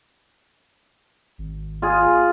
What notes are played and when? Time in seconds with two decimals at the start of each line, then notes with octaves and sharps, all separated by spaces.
1.38 G#1
1.82 F4 G#4